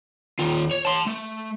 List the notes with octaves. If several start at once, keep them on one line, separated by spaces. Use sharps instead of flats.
D#2 F4
C#5
A5 C6
A3